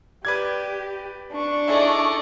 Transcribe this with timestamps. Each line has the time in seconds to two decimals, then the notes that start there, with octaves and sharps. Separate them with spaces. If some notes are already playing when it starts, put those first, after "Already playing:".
0.25 G4 B4 D5 G#6
1.32 D4 C#6
1.68 D#4 E4 G#4 A4 D5